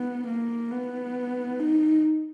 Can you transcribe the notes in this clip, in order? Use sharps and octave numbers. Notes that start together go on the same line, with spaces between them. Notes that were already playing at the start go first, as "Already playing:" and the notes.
Already playing: B3
A#3
B3
D#4